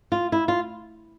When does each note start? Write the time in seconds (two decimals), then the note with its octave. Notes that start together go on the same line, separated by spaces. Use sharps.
0.12 F4
0.32 E4
0.48 F4